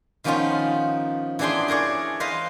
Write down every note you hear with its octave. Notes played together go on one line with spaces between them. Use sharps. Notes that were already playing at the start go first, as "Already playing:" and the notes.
D#3 F3 B3 C#4 D#4 F4
E3 B3 D4 G#4 G5 C6
G#4 A#4 C#5 D5
B4 C5 D#5 F5